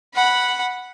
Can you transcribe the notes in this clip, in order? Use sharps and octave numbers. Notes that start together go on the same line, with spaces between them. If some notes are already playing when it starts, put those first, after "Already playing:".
F#5 B5